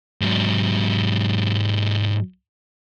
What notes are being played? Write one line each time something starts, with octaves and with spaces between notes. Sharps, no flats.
G#2 F#3